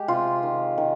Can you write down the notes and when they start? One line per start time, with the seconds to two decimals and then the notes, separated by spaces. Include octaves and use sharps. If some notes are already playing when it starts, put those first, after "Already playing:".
Already playing: G#3 G4
0.08 C3 F4
0.43 D#3
0.78 D#3